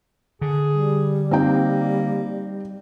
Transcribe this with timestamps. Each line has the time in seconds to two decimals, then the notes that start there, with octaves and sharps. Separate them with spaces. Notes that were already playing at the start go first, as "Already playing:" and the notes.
0.42 D3 G#4
0.73 G3
1.31 A#3 C4 D#4 G5